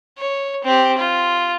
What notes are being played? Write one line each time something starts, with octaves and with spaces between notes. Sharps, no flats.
C#5
C4 G4
F4